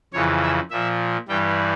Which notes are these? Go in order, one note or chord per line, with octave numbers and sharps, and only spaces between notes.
F2 C#3 E3 C#5
E5
A#2 F3 E5
G2 E3 G3 G5